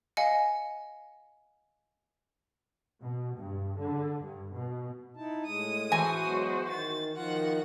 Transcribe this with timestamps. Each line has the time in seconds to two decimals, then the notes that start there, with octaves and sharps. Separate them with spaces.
0.17 D#5 F5 G#5 C#7
3.02 B2
3.37 G2
3.78 D3
4.22 G2
4.54 B2
5.17 D#4 E4 A5
5.46 A2 G#3 D#6
5.92 E3 F#4 C5 G#5
6.25 F#3 G#3 B3
6.67 D#3 A6
7.15 D#3 F3 F4 F#4 F#5